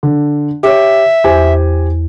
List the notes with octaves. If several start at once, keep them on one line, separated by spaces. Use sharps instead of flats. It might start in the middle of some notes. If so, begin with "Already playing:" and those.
D3
G4 C#5 E5
E2 G4 C5 G#5